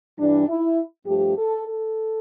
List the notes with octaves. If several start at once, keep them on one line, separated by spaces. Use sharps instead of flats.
G2 E3 G3 D4
E4
G2 F3 A3 G4
A4
A4